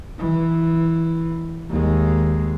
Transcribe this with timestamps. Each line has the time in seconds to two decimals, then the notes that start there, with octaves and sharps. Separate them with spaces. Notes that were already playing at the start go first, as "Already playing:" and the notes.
0.18 E3
1.70 D#2 G#3